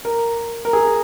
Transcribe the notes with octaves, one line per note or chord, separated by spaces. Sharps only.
A#4
A#4
G#4